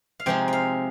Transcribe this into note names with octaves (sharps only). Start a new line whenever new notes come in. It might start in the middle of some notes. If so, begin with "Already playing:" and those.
F5
C3 F3 G#3 C4 D#4 G5
F5 G5